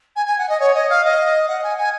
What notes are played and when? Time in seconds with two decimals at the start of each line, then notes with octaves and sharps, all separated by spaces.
0.16 G#5
0.26 G#5
0.38 F#5
0.49 D#5
0.59 C#5
0.74 D#5
0.89 F5
1.04 D#5
1.48 F#5
1.63 G#5
1.78 G#5